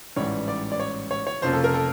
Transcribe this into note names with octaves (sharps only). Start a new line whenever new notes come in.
A1 G#2 E3 G3 C#5
D5
D5
C#5
C#5
C#5
F1 F2 C#3 F3 A#3 C5
A4
A#4
A4